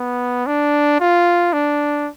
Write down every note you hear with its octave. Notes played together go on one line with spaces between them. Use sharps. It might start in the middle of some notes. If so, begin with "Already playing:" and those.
Already playing: B3
D4
F4
D4